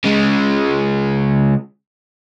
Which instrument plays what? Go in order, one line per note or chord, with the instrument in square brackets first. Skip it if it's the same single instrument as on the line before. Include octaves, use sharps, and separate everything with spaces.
[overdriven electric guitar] C#3 G#3